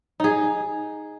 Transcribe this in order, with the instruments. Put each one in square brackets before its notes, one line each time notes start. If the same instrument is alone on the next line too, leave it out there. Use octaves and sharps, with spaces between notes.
[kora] D#4 G#4